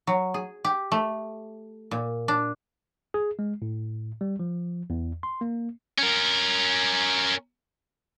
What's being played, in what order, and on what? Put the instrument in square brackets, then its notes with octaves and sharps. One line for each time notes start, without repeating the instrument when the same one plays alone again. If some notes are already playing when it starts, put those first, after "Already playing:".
[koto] F#3
G#4
G4
A3
A#2
D4
[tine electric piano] G#4
G#3
A2
G3
F3
E2
C6
A#3
[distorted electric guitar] C#4 A#4